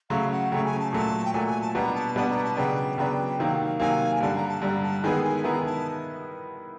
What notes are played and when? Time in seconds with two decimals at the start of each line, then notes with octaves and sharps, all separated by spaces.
0.10 C#3 F#3 A3 C#4 F5
0.31 F#5
0.51 C#3 F#3 A3 C#4 G5
0.65 G#5
0.79 A5
0.92 A#2 F#3 A3 A5
1.25 G5
1.33 A#2 F#3 A3 G#5
1.47 G#5
1.61 A5
1.74 B2 G3 B3 D4 A#5
1.95 A5
2.15 B2 G3 B3 D4 A5
2.30 A#5
2.44 A5
2.57 C#3 F#3 B3 D4 G5
2.98 C#3 F#3 B3 D4 G5
3.39 C3 D#3 F#3 A#3
3.80 C3 D#3 F#3 A#3 G#5
4.16 G#5
4.21 G2 D3 G3 A5
4.35 A#5
4.48 A5
4.62 G2 D3 G3 A#5
4.83 A5
5.03 D#3 G#3 B3 E4 G#4 G#5
5.24 G#5
5.44 D#3 G#3 B3 E4 G#4 A#5
5.65 A5